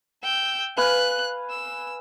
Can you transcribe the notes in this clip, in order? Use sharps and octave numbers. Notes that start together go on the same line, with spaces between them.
G5 E6
B4 F5 G#5 F#6
E6